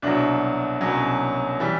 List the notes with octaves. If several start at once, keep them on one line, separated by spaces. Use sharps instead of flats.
C2 B2 F#3 D4
C2 B2 F#3 C#4
E3 G3